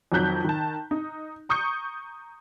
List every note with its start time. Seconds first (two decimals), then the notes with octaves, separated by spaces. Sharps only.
0.12 F2 D#3 F#3 F#6 G6 B6
0.45 D#3 A5
0.91 D#4
1.49 A#5 C#6 D#6 G6 C#7